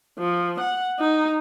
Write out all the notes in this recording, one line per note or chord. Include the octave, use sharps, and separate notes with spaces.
F3
F#5
D#4